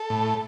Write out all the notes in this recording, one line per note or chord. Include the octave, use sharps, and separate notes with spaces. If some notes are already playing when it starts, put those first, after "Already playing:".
Already playing: A4
A2